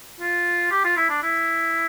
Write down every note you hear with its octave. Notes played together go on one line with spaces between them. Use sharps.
F4
G4
F4
E4
D4
E4